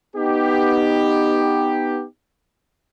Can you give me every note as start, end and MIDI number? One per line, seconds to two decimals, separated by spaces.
0.16 2.05 59
0.16 2.05 63
0.16 2.05 67